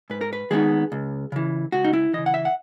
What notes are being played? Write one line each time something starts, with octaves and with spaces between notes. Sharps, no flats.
G#2 B4
A#4
B4
D#3 G#3 B3 D#4 G#4
C#2
C#3 E3
C#2 F#4
D#4
E4
C#3 E3 D#5
F#5
E5
F#5